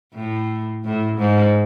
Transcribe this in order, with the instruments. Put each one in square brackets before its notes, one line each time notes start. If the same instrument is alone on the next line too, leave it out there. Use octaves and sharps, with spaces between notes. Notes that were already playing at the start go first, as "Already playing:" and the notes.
[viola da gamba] A2
A2
G#2